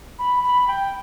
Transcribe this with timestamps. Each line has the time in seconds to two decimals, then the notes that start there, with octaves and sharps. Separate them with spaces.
0.19 B5
0.44 B5
0.68 G5